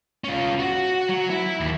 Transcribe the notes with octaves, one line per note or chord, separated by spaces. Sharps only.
C#4 F4
F#4
F#3
E4
D#2